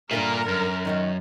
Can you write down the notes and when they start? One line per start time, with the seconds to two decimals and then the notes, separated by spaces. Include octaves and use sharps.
0.11 G2 A#2 D3 A#4 E5
0.48 F#2
0.85 D#3 F#3 D#4